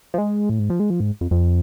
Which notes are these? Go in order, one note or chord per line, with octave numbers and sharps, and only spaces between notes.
F3
G#3
A2
G#2
F3
G#3
F3
G#2
F2
F2